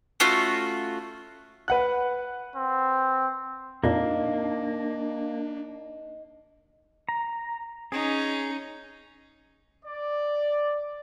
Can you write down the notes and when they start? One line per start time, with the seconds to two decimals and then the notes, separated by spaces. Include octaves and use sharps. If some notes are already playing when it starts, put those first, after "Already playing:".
0.20 A3 C#4 F4 F#4
1.68 B4 F#5 F#6
2.56 C4
3.84 F2 A#2 A#3 D4 D#4 A5
7.09 A#5
7.92 C#4 D#4 G#4
9.85 D5